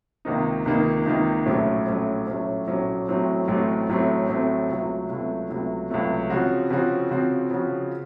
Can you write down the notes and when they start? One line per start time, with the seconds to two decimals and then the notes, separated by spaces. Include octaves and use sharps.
0.25 C#2 C3 D#3 A#3 D#4
0.66 C#2 C3 D#3 A#3 D#4
1.06 C#2 C3 D#3 A#3 D#4
1.46 A#1 A2 F#3 A3 C#4
1.87 A#1 A2 F#3 A3 C#4
2.27 A#1 A2 F#3 A3 C#4
2.68 A#1 A2 F#3 A3 C#4
3.08 A1 A2 F#3 A3 C4
3.48 A1 A2 F#3 A3 C4
3.89 A1 A2 F#3 A3 C4
4.28 A1 A2 F#3 A3 C4
4.69 C#2 C3 F#3 A3
5.09 C#2 C3 F#3 A3
5.50 C#2 C3 F#3 A3
5.90 C#2 C3 F#3 A3
6.30 C#3 F3 C4 F#4
6.70 C#3 F3 C4 F#4
7.11 C#3 F3 C4 F#4
7.51 C#3 F3 C4 F#4